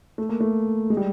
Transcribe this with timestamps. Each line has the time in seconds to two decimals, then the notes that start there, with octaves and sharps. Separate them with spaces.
0.18 A3
0.29 A#3
0.40 A3
0.90 G#3
0.97 G3